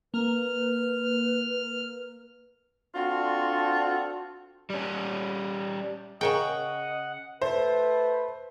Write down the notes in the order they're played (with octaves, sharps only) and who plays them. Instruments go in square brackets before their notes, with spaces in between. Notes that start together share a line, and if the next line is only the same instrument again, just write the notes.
[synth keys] A#3 [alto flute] B4 [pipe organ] F6
[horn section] C4 D4 F4 F#4 A4
[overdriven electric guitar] G3 C#4
[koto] C#3 C#5 G5 [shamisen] G#4 A#4 [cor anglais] D#5 [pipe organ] F#5
[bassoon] A3 [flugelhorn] B4 [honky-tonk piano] C5